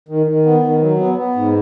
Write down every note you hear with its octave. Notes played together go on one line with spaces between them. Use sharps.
D#3
D#3
B3
D#3
F#3
B3
B3
G#2